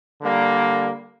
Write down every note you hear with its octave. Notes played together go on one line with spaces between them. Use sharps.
D3 G3 A#3